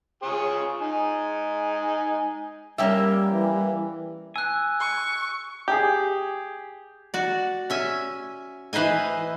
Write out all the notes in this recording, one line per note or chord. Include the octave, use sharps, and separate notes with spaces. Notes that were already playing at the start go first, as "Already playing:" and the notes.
F4 G#4 C#5
D#4 G#5
G3 A#3 C#4 G4 A#4 E5
E3
G#5 E6 F#6
C#6
G4 G#4
F#4 D5
C#4 E5 G#5
E3 B4 C5 D#5 G#5